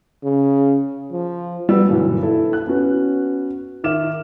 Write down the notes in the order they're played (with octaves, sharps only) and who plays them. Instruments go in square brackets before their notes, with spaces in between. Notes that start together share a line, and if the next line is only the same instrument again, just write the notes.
[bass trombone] C#3
F3
[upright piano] G3 B3 F#4 E6
B1 G2 A#2 D3 E3 F#3
E4 A4
F#6
B3 C#4 F#4
D#3 E5 D6 F6 E7